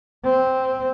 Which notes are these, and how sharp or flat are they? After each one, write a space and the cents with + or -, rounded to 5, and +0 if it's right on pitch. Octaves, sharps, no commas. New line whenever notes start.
C4 -5